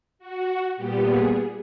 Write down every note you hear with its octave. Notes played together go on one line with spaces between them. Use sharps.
F#4
A#2 G3 B3 G4
G#4